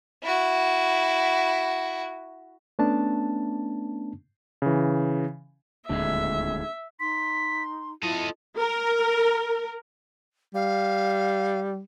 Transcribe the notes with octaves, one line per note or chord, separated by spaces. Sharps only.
E4 F#4
A3 B3 C#4 D4 A5
C#3 E3
D#1 D2 A#2 D3 G#3 D4 E5
D#4 C6 B6
E4 F4 A4 D#5 D#7
A#4
G3 F5